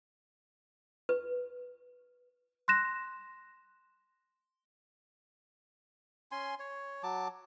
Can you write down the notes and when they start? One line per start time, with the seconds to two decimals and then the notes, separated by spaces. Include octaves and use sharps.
1.09 B4
2.68 C6 F#6 A#6 E7
6.32 C#4 G#5 C6
6.60 C#5
7.03 F#3 A5 D6